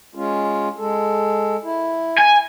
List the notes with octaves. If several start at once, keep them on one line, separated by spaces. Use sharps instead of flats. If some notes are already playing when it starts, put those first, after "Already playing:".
G#3 C#4 F4
G#3 A4
E4
G#5